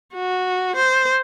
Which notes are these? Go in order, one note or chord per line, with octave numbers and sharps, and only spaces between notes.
F#4
C5